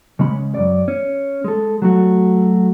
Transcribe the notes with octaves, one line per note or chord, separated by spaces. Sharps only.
C#3 G#3 C#4 B5
F#2 D5
C#4
G#3 A4
F#3 A3 F#4